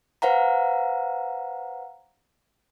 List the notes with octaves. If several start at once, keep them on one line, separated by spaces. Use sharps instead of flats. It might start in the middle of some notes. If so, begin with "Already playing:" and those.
B4 C5 F5 F#5 A#5